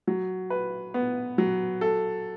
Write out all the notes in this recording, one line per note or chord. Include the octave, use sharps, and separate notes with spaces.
F#3
B4
B3
F#3
A4